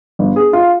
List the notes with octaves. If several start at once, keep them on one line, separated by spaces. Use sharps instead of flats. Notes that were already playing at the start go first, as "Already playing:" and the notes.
G1
G#4
F4